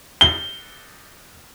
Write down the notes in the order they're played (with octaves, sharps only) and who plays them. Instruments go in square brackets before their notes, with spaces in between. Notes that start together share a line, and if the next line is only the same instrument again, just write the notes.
[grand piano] G7